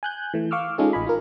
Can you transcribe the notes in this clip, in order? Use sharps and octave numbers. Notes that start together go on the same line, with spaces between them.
G#5 F#6 G6
E3 A3
F5 C#6 D6 E6 F6
G#3 C#4 D#4 F4 G#4 A4
A1 D#5 G#5 B5
F4 A#4